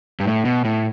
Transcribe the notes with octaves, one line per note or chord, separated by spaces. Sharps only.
G2
A2
B2
A2